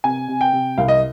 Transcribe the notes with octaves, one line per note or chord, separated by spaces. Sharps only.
C3 G#5
C3
G5
C3
C2 F5
D#5